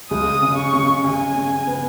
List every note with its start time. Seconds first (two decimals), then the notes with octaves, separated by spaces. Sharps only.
0.11 C#2 D#6
0.42 C#3
0.58 C#6
0.73 C#3
1.04 C#3 G#5
1.35 C#3
1.67 B3